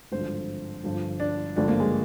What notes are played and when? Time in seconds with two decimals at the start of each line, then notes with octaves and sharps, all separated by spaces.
0.12 G#1 G2 D3 F3 C5
0.84 G1 G2 D3 F3
1.20 D4
1.56 G#1 G2 D3 F3 D4
1.68 A#3
1.80 G#3